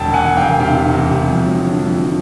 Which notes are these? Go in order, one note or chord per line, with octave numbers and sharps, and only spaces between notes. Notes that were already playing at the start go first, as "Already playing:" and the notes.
Already playing: E1 G5 A5
E2
F#5 G#5
E2
F5 G5
E1
C3 F5 G5
C3
E2
C3
F2
F#3
D3
F2
F#3